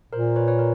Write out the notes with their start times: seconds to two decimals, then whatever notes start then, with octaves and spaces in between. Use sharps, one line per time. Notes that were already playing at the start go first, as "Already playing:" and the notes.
0.12 A#2 A#4 C5
0.36 B4 C#5
0.48 B4 C#5
0.59 A#4